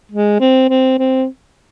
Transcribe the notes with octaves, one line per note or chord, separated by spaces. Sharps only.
G#3
C4
C4
C4